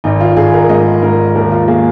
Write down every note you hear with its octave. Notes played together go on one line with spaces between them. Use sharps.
G#1 D#4
F4
G#1 G#4
A#4
G#2 D#5
G#2 A#4
D#2 A#4
F4
A#3 G#4